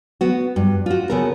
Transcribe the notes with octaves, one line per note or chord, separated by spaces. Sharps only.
B3 F#4
G2
F4 F#4
C#3 B3 A4 A#4